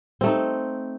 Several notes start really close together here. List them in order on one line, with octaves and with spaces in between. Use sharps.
C4 A3 D#4